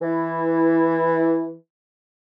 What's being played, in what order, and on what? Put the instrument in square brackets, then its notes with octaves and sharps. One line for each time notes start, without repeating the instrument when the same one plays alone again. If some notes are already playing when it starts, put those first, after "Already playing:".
[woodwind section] E3 E4